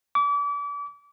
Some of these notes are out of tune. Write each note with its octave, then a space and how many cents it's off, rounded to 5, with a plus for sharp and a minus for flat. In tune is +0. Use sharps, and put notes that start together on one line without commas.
D6 -35